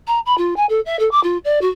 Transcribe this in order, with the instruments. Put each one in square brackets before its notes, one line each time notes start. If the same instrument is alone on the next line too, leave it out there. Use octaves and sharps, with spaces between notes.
[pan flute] A#5
B5
F4
G#5
A4
E5
A4
D6
F4
D5
F#4